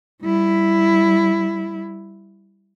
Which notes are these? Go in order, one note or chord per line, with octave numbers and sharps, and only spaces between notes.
G3 E4